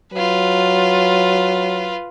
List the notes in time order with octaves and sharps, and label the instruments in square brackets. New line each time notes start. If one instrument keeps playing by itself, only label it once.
[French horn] F#3 [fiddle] F4 B4